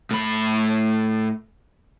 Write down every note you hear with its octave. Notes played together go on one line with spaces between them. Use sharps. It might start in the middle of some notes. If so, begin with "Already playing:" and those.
A2 B5